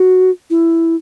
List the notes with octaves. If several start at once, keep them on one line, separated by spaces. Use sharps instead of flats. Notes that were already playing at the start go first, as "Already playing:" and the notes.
Already playing: F#4
E4